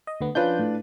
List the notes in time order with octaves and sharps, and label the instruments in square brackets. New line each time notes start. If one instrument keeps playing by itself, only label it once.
[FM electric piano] D#5
D2 D3 B3
[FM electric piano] F3 C#4 G6 [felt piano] D4 F4 B4
[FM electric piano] A2